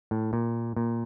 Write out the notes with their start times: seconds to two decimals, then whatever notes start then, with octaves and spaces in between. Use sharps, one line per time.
0.11 A2
0.33 A#2
0.76 A#2